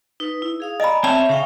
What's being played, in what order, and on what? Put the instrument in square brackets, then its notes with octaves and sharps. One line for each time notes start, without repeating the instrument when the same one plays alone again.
[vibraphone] D#4 B4
E4
G#4 F5 D#6
[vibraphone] D5 G#5 A#5 [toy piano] D#5 B5
[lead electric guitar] C4 C#5 [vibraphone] E5 [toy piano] A5
[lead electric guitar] C#3 [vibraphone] C#4 F5 G5